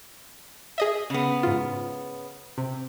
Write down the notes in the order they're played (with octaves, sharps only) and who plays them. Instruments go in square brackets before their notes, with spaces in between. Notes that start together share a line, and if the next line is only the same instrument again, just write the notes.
[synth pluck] G#4 D#5 E5
[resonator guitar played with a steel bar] C#3 B3
[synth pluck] G#2 F4
C3